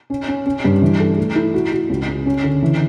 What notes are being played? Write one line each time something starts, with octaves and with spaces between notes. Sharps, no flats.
C#4
C#4
C#4
G2
E3
A4
A3
E4
F#4
F#4
C#2
C#3
C#4
D3
E3